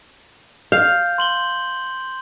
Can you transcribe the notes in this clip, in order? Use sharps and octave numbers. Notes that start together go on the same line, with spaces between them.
F5 G6
C6 F#7 G7